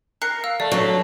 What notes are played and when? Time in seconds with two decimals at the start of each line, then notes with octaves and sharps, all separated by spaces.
0.22 A#4 F#6 C7 C#7
0.44 F5 E6
0.60 A3 D5
0.72 D3 F#3 C#6